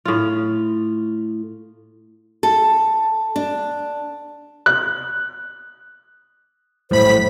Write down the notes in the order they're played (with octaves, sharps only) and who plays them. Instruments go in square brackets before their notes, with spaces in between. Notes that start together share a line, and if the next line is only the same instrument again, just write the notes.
[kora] A2 F4
[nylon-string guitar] A4
D4
[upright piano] F#6
[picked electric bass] A#1 F#2 G3 [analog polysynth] A2 B5 B6 [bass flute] C5